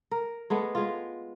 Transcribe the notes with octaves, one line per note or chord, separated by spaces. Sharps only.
A#4
G#3 A3 B3
G#3 F4